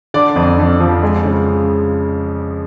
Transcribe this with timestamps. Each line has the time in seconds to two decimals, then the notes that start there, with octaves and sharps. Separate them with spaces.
0.14 D3 D5
0.36 F2
0.59 F2
0.80 F3
1.03 G#3
1.25 C#3